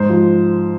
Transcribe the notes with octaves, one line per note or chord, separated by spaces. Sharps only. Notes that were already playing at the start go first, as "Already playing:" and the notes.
Already playing: G#2 C5
F3